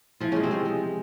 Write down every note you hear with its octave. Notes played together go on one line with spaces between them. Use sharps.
E3 F3 F4
C#3 G#3 C#4
C3 C4
G#3
G#3